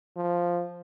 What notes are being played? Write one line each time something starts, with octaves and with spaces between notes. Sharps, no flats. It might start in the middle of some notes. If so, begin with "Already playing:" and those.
F3